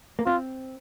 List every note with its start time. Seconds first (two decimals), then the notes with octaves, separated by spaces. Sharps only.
0.19 A#3
0.26 C4 F4